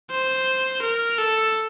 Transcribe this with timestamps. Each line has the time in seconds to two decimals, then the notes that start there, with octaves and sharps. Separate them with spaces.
0.11 C5
0.82 A#4
1.18 A4